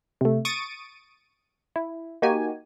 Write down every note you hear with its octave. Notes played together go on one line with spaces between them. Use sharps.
C3 A3
C#6 D#6 A6 D7 D#7
E4
A#3 D#4 F#4 G4 G#5